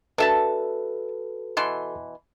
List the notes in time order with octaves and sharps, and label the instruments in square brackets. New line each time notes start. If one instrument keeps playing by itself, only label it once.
[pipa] D4 E5 A5 [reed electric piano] F#4 A4 B4
[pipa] B2 E3 C6